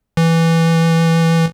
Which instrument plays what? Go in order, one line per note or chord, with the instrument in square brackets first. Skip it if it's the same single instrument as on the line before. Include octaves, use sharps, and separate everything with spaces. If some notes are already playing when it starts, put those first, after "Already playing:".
[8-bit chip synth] E3